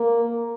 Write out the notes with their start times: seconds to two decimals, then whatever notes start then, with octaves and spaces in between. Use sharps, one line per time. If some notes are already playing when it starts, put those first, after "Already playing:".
Already playing: A#3